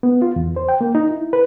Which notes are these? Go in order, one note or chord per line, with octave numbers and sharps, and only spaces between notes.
B3
F4
E2
C5
G5
A#3
D#4
E4
B4